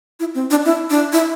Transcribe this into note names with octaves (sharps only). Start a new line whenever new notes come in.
E4
C4
D4
E4
D4
E4